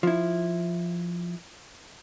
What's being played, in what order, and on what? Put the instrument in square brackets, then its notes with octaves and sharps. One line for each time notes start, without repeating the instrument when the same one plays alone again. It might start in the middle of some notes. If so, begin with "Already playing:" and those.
[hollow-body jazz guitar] F3 E4